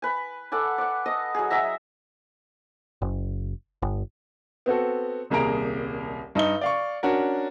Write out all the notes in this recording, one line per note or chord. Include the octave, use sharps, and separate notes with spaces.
B4 G#5
A4 D5 F#5 G#5
D5 F#5
D#5 A5 D#6
F#3 G#4
F#3 G#4 E5 A#5
F#1
G1
B3 C4 F#4 A4
D#1 C2 A#3 G#4 A#5 D7
G2 D#4 D#5 G7
D5 F5 C#6
C#4 D4 F#4 A#4